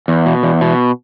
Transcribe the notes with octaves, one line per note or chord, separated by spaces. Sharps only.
E2
B2
E2
B2